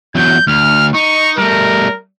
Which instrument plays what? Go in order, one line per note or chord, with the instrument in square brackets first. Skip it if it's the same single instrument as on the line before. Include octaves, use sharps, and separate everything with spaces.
[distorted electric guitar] E2 F#3 [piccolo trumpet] G6
[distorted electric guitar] D2 [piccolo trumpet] F6
[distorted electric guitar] D#4 [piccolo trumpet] C#6
[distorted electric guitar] G3 A3 [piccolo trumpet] A#4